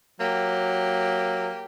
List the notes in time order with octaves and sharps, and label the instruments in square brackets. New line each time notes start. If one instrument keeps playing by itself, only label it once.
[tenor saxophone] F#3 [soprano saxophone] A#3 [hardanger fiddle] G4